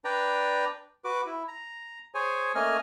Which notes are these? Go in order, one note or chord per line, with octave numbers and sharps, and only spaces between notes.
D4 B4 D5 G5 A#5
F#4 B4 D6
E4
A#5
G#4 C5 C#5 G#5
A3 A#3 C#4 D#5 G#5 F6